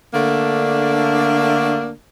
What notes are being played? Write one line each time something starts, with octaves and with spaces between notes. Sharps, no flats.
D3 A3 A#3 D4